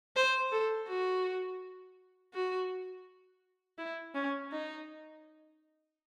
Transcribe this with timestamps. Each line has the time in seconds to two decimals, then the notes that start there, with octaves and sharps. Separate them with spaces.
0.16 C5
0.52 A4
0.89 F#4
2.34 F#4
3.78 E4
4.15 C#4
4.51 D#4